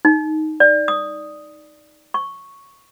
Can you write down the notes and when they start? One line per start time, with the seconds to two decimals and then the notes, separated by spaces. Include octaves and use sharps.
0.05 D#4
0.60 D5
0.88 D#6
2.14 C#6